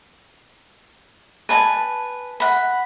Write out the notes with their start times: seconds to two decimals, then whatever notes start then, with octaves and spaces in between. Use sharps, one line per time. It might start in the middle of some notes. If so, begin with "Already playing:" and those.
1.49 B4 G#5 A5
2.40 F#5 B5